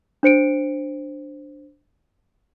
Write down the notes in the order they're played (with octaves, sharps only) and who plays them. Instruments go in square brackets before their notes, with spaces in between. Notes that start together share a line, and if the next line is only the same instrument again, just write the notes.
[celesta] D4 C5 C#7 D7